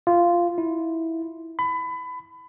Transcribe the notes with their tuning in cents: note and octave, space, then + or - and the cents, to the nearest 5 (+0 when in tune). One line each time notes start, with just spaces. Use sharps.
F4 -10
E4 -15
B5 +25